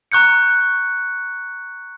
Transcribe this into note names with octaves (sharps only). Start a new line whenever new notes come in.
A#5 C#6 F#6 G6 C#7